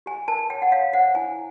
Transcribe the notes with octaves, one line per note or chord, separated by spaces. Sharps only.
G4 G#5
A#4 A5
C#5 G5
F#5
C#5 F5
C5 F#5
E4 G#5